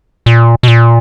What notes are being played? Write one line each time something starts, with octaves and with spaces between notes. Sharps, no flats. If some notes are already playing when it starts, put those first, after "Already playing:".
A#2
B2
A#2